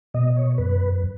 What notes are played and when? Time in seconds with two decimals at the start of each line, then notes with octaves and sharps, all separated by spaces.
0.14 B2 D#5
0.36 C#5
0.58 F#2 B4